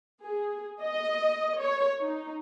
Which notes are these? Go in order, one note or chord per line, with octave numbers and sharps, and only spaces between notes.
G#4
D#5
C#5
D#4